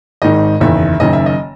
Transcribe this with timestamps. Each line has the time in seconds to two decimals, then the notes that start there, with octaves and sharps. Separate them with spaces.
0.22 G#1 G#2 D#3 D#5
0.61 F#1 E2 D#3 E5
1.00 F#1 F#2 D#3 D#5
1.13 E5
1.26 D#5